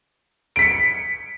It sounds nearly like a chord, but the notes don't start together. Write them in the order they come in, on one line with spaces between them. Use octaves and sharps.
D7 B6 C#7